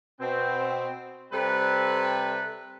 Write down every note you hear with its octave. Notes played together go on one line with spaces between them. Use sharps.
B2 C4
C3 G3 C4 A4 B4